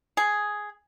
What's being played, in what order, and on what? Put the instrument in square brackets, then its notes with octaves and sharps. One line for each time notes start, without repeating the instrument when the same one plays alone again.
[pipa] G#4